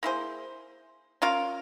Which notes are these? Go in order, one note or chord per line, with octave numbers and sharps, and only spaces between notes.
A#3 E4 G#4 C5
C#4 F4 A#4 F5